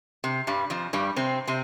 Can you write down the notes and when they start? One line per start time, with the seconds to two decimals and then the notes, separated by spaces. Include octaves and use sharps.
0.24 C3
0.47 G2 G3
0.70 F2 F3
0.93 G2 G3
1.16 C3 C4
1.48 C3 C4